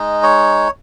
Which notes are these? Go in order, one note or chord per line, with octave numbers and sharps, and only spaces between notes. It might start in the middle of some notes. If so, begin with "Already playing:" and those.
Already playing: G#3 D#4 D#5
C#5